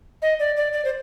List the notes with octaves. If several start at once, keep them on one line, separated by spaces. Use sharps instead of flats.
D#5
D5
D5
D5
C5